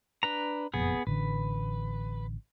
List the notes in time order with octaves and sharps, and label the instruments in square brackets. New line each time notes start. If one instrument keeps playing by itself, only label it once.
[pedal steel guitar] D4 B4 A#5
[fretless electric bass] F#1 F2 A#2 [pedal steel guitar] B3 G#4
[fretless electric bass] A1 D3 [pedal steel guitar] B4